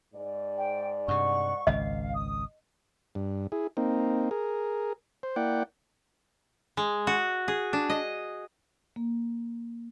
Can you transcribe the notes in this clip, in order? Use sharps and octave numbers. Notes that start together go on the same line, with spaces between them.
G#2 D5
G5
G2 C3 F#5 C#6
G#1 C#2 D#5 F5
D#6
G2
E4 G#4
A#3 C4 D#4
G#4 A#4
C5
A#3 E4 D5 F#5 G5
G#3
F#4
G#4
D4
D#5
A#3